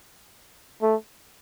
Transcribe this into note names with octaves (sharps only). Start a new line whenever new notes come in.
A3